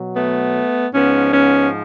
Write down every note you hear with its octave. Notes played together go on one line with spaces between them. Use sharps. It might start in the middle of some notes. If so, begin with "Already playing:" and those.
Already playing: B2 F#3
A3 B3
G#2 F3 B3 C#4
B3 C#4